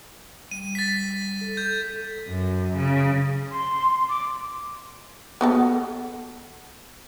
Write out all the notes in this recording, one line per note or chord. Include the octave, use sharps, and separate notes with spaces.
G3 D#7
A6 B6
A4
G6
F#2
C#3
C6
D6
B3 F#4 A4